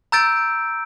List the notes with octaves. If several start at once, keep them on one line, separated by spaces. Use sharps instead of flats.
A#5 E6 G6 A6 D7